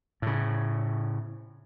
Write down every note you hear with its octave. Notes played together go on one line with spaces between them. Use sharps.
A2 C#3